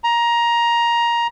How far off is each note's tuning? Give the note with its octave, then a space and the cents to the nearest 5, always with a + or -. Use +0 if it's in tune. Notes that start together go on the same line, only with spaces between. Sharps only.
A#5 +15